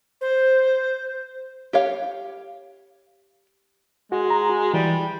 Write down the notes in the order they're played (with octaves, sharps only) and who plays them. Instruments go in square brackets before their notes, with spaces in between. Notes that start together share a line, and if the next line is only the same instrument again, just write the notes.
[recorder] C5
[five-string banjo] G4 C#5 F5
[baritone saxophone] G#3 [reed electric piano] F#4
[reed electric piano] A#5
F#4
[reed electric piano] E3 [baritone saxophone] G3